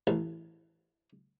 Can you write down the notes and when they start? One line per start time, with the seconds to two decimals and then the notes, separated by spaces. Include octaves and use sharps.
0.07 A1